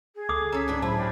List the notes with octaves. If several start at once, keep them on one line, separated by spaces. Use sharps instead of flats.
G#4
C#2 A4 D6 D#6
C#4 A4 A#5 E6 B6
G#2 D4 B5
A2 F#3 E4 G#4 C5 A5 B5
C#4 D4 G4